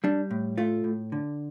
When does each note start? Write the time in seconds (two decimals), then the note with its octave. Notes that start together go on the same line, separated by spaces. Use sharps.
0.04 G3 D4
0.31 A2
0.58 A3 F4
0.84 A2
1.12 D3